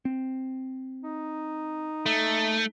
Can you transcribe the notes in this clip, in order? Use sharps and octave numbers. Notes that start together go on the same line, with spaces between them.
C4
D#4
A3